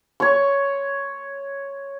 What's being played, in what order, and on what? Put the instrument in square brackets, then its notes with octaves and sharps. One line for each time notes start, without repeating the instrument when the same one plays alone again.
[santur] C#5 C#6